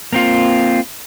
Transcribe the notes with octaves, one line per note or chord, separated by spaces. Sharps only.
A#3 C4 F4